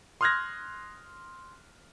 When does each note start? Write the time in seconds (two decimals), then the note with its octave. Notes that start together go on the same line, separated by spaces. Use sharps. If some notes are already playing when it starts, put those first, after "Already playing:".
0.21 C6 D#6 F6 F#6 G#6 A#6